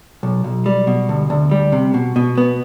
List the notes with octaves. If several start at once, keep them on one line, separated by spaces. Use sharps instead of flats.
B1
B1
G3
B2
D2
D2
G3
C3
B2
B2
B3